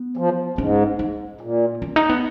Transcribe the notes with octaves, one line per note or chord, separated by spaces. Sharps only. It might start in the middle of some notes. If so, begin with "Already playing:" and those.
Already playing: B3
F3
G#2 C#4
D#4
A#2
C#4
D#4
B3